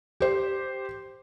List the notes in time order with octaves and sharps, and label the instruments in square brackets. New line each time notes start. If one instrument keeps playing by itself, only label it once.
[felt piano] G4 C5